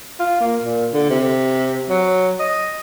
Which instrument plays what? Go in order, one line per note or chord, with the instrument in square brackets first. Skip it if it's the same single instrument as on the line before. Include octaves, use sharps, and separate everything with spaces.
[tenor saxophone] F4
A#3
A#2
D3
C3
F#3
D#5